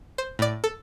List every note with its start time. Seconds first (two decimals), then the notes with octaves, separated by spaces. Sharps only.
0.18 C5
0.39 A2 D5
0.64 A4